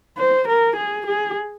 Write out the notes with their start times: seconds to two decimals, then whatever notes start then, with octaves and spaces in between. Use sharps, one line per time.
0.18 C5
0.48 A#4
0.76 G#4
1.07 G#4